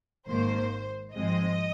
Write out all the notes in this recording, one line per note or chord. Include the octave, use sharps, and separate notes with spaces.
G#1 G#2 D#3 A#3 C5
G#1 G#2 F3 G#3 C4 D#5